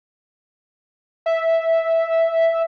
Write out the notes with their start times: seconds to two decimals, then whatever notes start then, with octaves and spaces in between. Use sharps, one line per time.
1.26 E5